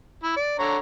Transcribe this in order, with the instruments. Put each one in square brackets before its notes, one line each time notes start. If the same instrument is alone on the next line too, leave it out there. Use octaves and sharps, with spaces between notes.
[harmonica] E4
D5
D3 C#5 A#5